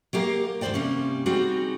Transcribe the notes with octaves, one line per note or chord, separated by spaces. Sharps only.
F#3 A#3 G4 A#4 F5
E2 G#2 G#3 C5 D5 G5
C3 G3 A#3 C#4
G3 C4 D#4 F#4 G#4